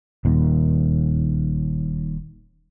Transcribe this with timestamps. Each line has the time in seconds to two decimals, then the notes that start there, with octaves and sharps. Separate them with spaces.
0.25 D#1 D#2